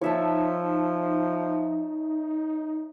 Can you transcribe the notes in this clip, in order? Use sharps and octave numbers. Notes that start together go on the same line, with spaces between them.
F3 D#4 C#5 E5 A5